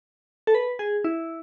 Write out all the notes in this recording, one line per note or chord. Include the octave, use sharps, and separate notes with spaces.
A4
B4
G#4
E4